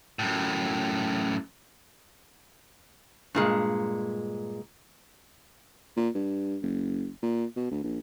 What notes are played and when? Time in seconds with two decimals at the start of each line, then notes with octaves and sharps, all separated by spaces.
0.19 F#2 A2
3.35 G2 A#2 G#3
5.97 A#2
6.15 G2
6.62 F#1
7.23 A#2
7.56 B2
7.71 D2
7.84 A#1